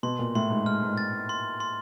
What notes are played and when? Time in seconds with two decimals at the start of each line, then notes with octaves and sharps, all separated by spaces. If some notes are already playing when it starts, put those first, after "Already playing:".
0.03 B2 C6
0.19 A#2
0.35 A2 C6
0.50 G#2
0.66 G#2 F6
0.83 G#2
0.98 A6
1.29 C6
1.60 C6